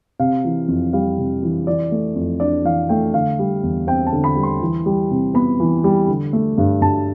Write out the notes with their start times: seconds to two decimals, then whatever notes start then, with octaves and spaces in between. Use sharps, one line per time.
0.19 C3 F5
0.44 E3
0.68 F2
0.93 G3 F5
1.18 C3
1.43 E3
1.67 E3 D5
1.92 A3
2.15 F2
2.40 D4 D5
2.65 E3 F5
2.89 A3 G5
3.14 D3 F5
3.39 G3
3.63 E2
3.87 C4 G5
4.07 A5
4.12 D3
4.24 B5
4.36 G3
4.43 C6
4.61 E3
4.86 G3
5.11 C3
5.34 B3 B5
5.60 E3
5.84 G3
6.08 D3
6.33 A3
6.58 G2
6.81 G2 A5